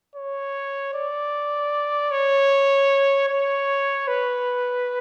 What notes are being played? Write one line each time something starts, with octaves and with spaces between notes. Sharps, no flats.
C#5
D5
C#5
C#5
B4